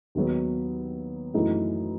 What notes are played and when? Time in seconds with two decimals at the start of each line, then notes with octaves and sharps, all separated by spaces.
0.15 D#2 D#3 F#3 B3
1.34 F#2 E3 A3 D#4 F#4